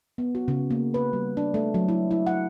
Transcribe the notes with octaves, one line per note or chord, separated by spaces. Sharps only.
B3
F#4
C#3
A#3
B4
G3
D4
A3
F#3
E4
E4
F#5